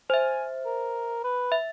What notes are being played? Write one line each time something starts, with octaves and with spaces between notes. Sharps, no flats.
C5 E5 G#5
A#4
B4
E5